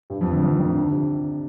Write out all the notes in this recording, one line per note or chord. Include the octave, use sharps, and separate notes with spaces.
G2 G3
F2 F3
D2 D3
F2 F3
D#3
D2 D3
D3
C3